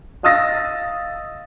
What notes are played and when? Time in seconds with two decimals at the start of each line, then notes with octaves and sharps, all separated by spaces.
0.23 D#5 F5 D#6 E6 A6 A#6